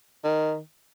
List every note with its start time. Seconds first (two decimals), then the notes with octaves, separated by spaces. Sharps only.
0.24 D#3